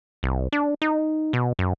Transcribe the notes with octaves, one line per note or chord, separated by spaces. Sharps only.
C2
D4
D#4
B2
F#2